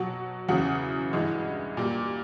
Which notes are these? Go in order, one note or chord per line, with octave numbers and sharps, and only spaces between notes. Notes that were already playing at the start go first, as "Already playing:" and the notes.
Already playing: B2 F#3 F#4
E2 C#3 F#3 F#4
G2 E3 G#3
A#2 G3